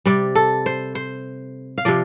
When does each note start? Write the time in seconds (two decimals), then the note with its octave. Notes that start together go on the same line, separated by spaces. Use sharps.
0.05 C3 G3 D5
0.35 A4
0.66 C5
0.95 C5
1.78 F5
1.85 C3 F3 D5